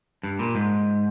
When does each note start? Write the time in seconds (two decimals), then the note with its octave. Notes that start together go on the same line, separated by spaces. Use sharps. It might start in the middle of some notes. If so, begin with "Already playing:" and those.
0.23 G2
0.39 A#2
0.55 G#2